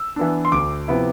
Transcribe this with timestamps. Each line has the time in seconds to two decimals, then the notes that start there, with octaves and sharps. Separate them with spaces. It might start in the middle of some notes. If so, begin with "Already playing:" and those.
Already playing: E6
0.16 E3 B3 D4
0.45 C6
0.52 D2 D6
0.88 C3 F3 B3 E4